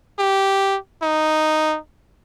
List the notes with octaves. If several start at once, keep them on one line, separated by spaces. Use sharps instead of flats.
G4
D#4